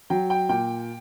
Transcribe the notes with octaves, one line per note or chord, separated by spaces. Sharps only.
F#3 G5
G5
A#2 G5